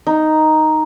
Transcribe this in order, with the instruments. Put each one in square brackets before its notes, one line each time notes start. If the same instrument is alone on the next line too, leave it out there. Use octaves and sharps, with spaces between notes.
[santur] D#4